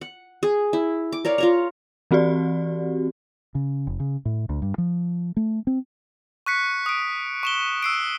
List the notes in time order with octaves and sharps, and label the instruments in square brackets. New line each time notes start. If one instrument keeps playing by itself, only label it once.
[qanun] F#5
G#4
E4
D6
A#4 C#5 D5 F5
F4 C#5 A#5
[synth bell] E3 C4 F#4 G4 D5
[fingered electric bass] C#3
F1
C#3
A2
D2
G2
F3
A3
C4
[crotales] C#6 F#6 B6 C#7
D#6 D7
C#6 E7 G7
E6 C7 D7